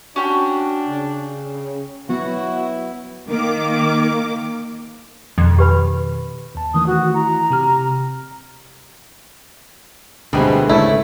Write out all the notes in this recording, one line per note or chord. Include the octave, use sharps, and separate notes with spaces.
C#4 D4 F#4 G4
C#3
F#3 B3 E4 F#4
D#3 A#3 D6
F2 B2 D#3
G4 B4 B5
D#2 A5
D#3 E3 A3 D#6
F#4
E4 A#5
C3 G4 F6
D2 B2 D3 E3 G3 G#3 C4
G#1 G#2 C#3 A3 C#4 E4 A4